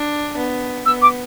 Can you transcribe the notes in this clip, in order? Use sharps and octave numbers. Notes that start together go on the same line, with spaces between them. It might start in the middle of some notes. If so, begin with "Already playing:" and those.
Already playing: D4
B3
B3 E6
D6